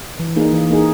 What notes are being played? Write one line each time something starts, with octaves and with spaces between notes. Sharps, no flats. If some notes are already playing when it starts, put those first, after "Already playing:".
E3
A#3 D#4 G#4
E3
A#3 D#4 G#4